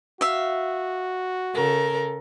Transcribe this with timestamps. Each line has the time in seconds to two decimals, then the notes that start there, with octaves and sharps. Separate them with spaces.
0.21 F#4 E5 F5
1.54 C#3 A4 A#4